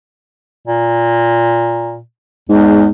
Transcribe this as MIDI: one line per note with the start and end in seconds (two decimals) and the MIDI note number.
0.68 2.00 46
2.49 2.87 40
2.49 2.91 44